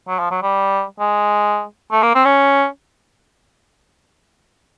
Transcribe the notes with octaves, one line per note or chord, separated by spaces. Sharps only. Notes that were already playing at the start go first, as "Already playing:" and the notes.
F#3
F3
F#3
G3
G#3
A3
A#3
C4
C#4